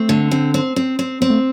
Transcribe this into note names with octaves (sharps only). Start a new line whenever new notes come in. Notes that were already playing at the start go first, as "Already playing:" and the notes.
Already playing: A3 C4
D3
C4
C4
C4
C4
B3 C4
A3